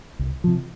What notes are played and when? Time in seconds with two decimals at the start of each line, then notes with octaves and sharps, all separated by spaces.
0.19 C2
0.44 C3 F3